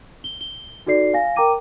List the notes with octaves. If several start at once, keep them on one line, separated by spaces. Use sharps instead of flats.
G7
G7
D#4 F#4 A4 D5 C7
F5 G#5 A#6
A#4 G5 A#5 D6 D#7